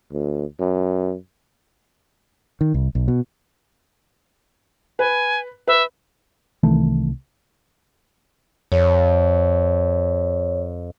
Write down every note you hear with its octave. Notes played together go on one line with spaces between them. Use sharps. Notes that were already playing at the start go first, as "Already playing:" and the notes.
D2
F#2
D#3
C2
B1
B2
B4 G#5
B4 E5
C2 D#3 E3 A3
F2 C#5